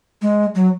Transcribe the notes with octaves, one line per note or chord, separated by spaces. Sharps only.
G#3
F#3